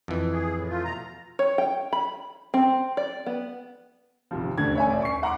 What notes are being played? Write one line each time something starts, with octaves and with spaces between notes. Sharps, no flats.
F2 E3
G#4
A2
A3 F4
B2 A#5
C#5
G5
B5
C4
D5
B3
G#1 C3 F3
D#1 D2 A3 D4 G#6
C#5 E5 G#5
D#1 D5
C#6 C7
E5 F#5 A#5 C6 D6